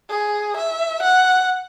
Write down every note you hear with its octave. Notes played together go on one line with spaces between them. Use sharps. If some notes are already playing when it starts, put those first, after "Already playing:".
G#4
E5
F#5